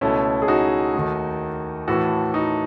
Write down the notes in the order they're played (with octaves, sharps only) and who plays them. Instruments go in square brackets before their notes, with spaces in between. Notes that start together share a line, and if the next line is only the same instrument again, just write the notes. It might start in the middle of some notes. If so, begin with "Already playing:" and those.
[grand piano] C#2 B2 A3 C#4 E4
G#4
D#4 F#4
D#2 D#3 A3
A2 E3 A3 F#4 A4
D#4 F#4